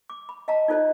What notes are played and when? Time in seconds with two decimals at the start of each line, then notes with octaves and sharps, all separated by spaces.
0.10 D6
0.29 B5
0.48 D#5 F5 A5 A#5
0.68 D#4 F4 A4 C5 D5 D#5